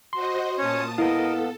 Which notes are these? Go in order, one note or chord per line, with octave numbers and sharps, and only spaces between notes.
F#4 C5 D#5 C6
A#2 C#4 C#5 A5 D#6
B3 E4 A4 A#4 D#5 F5